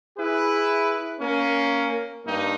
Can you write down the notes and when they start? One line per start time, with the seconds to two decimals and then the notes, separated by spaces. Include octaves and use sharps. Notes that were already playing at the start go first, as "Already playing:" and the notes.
0.17 E4 G#4 B4
1.20 A#3 C#4
2.25 G2 A#3 D#4